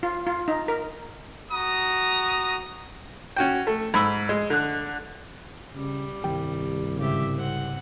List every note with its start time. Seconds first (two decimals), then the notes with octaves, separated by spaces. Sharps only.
0.03 F4
0.27 F4
0.48 D#4
0.68 A#4
1.52 F#4 A#5 D#6
3.36 C#4 F#4 G5
3.67 A3
3.94 G#2 B5 E6
4.29 G#3
4.50 D3 F#6
5.75 C#3 G3
6.24 C2 G2 D#3 G4 G5
6.99 G#2 C#3 G4 E5
7.35 C4 F#5